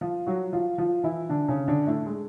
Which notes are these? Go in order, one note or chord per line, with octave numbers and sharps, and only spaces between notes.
F3 F4
F#3 F#4
F3 F4
F3 F4
E3 E4
D3 D4
C#3 C#4
D3 D4
A2 A3
G#3